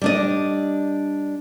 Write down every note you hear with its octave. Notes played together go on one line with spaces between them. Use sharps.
G3 D4 D#5